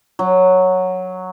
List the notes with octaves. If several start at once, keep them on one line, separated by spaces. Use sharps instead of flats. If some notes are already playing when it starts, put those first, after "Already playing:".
F#3